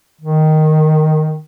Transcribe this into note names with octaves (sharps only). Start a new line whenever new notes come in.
D#3